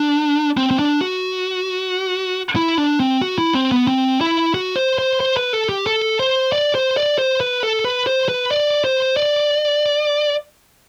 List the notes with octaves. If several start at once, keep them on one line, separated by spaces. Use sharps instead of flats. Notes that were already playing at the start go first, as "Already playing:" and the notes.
Already playing: D4
C4
C4
D4
F#4
E4
D4
C4
F#4
E4
C4
B3
C4
E4
F#4
C5
C5
C5
B4
A4
G4
A4
C5
D5
C5
D5
C5
B4
A4
B4
C5
B4
D5
C5
D5